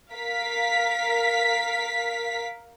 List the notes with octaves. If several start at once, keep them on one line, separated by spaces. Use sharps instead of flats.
A#4 F5 B6